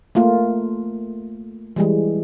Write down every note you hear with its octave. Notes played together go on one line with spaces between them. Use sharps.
A3 A#3 F4
E3 G3 G#3